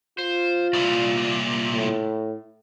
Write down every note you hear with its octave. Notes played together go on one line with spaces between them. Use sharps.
F4 C5
C2 A#2 D5 E5
A2